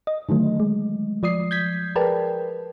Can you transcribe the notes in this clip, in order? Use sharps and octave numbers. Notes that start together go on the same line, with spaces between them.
D#5
D3 D#3 F#3 A3
G#3
F3 D5 D#6 C7
G6 G#6 B6
G#4 A#4 B4 D5 G5 A5